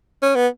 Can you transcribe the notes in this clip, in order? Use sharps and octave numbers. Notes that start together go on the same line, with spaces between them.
C#4
B3